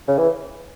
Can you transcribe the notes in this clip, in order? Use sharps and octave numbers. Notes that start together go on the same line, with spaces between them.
C#3
E3